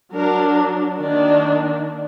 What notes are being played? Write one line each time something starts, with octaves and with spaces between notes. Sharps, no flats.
F#3 D4 A#4
D#3 A#3 D4